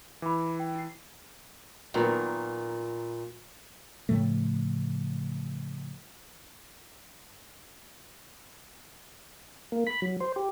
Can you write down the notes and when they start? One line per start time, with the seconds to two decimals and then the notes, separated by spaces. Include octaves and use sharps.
0.22 E3 B5 D6
0.60 G5
0.75 E4 C7
1.94 A#2 D#3 F#3 B3
4.09 A2 C#3 F3 A3
9.72 A#3
9.87 B5
10.02 F#3
10.20 C5
10.36 G4